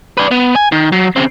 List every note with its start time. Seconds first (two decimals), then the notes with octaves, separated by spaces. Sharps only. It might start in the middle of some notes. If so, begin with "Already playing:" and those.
0.17 B4 D5
0.31 B3
0.55 G#5
0.72 D#3
0.92 F#3
1.16 C#3 C4